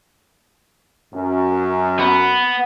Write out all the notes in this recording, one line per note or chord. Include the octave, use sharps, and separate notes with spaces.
F#2
B3